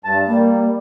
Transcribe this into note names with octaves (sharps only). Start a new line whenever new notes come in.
G2 A5
G3 A#3